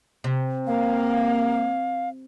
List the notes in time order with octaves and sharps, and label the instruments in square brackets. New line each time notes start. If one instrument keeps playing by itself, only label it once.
[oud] C3
[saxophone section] A#3 [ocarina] F5